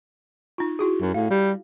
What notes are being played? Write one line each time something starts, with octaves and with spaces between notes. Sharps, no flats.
D#4 F4
E4 F#4 G#4
F#2
A2 F5
G3